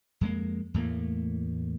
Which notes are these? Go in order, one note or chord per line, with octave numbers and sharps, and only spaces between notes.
F2 G#3 A#3
E2 A2 A3 A#3